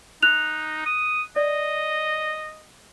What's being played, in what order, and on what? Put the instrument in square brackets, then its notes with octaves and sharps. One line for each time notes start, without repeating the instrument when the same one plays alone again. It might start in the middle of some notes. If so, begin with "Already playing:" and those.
[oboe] D#4 [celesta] F#6 F7
[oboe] D#6
[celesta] D5 [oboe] D#5